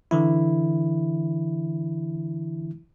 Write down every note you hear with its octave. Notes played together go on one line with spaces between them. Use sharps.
D3 E3 E4